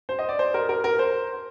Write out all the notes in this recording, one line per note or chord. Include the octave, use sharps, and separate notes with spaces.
C5
D#5
D5
C5
A#4
A#4
A#4
C5